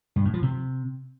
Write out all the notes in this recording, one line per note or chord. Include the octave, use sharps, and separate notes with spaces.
G2
A2
F3
C3